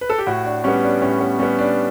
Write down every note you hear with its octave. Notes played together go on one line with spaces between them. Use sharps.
B4
A4
G4
A2 F#4
D4
G3 B3 C#4
D4
A2 C#4
B3
G3 B3 C#4
D4